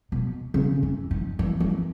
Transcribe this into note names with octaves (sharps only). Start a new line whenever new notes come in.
B2
C#3
E3
D#3
E3
E3